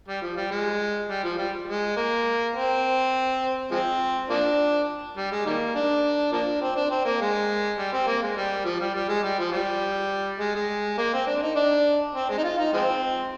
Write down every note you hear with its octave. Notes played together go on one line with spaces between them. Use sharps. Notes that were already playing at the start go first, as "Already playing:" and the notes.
G3
F3
G3
G#3
G3
F3
G3
G#3
A#3
C4
F3 G#3 C4
F3 A#3 D4
G3
G#3
D#3 G3 A#3
D4
F3 A#3 D4
C4
D4
C4
A#3
G#3
G3
C4
A#3
G#3
G3
F3
G3
G3
G#3
G3
F3
G3
G#3
G#3
A#3
C4
D4
D#4
D4
C4
G#3
D#4
F4
D#4
F3 G#3 C4